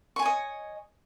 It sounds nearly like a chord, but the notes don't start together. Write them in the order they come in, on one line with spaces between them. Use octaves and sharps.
C#6 G#5 C#5 D#5